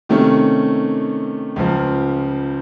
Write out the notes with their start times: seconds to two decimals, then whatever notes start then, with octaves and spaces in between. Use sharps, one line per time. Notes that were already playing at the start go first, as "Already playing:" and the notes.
0.09 C3 D#3 A3 C#4
1.56 C#2 C#3 F3